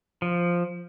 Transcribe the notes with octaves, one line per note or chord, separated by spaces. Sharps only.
F3